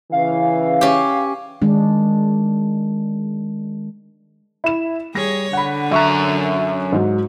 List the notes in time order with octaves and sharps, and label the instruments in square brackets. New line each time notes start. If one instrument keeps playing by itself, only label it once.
[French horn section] C#3 E3 [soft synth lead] F5
[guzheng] C#4 G4
[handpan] D#3 G#3 D4
[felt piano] E4 E7
[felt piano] G3 A#6 [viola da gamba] G#4 C#5
[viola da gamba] D3 [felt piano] F#5 B5
[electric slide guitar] F#2 A#5 [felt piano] E5 C#6 F#6
[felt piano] G#2 F#3